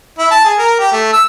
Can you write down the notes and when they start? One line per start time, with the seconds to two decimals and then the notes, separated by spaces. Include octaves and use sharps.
0.19 E4
0.31 A5
0.45 G#4
0.58 A#4
0.79 G4
0.92 A3
1.13 E6